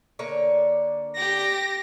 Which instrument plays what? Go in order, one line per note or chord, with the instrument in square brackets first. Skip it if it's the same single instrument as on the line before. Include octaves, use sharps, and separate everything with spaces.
[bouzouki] D3 A#3 C#5
[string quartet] G4 A#6